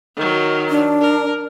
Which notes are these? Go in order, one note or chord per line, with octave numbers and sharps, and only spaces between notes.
D#3 F#3
D4
A#4